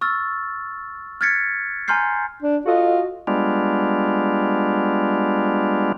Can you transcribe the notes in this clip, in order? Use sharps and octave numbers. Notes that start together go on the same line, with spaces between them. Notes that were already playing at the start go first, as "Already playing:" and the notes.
C#6 E6 F6 A6
F6 F#6 G#6 A6 B6 C#7
G#5 A#5 C6 F6 G6 C7
D4
F4 F#4 A4 D#5
G3 G#3 B3 D4 F4